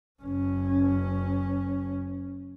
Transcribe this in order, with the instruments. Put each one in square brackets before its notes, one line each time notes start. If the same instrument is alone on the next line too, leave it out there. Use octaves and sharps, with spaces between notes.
[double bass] F#1 C#4